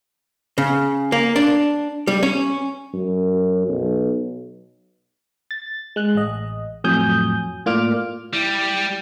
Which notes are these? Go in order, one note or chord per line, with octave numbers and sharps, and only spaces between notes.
C#3
A#3
D4
G3
C#4
F#2
B1
A6
G#3 F#6
A1 D#5
F2 A2 F#3 G#5 D#6 G6
A2 A#3 F4 D5 D6 F6
G3 E4